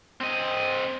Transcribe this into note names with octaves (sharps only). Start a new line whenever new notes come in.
C4 D#5